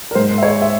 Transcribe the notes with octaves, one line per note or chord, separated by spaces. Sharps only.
A#4
G#2 C5
E5
G#3 C#5
E5